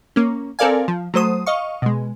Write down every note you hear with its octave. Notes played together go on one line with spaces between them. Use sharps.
A#3 C#4
C4 A4 A#4 D5 F5 G#5
F3
F#3 A3 C5 D#6
D#5 F5 C#6
B2 G#3